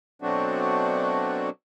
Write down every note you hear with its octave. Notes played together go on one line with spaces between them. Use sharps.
B2 F#3 A3 C4 D4 F#4